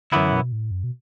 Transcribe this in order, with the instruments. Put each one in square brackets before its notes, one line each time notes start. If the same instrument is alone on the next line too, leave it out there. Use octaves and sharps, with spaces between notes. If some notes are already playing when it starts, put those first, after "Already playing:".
[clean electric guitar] F#2 E3 B3 E4 [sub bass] D3
[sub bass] B2
A2
F#2
B2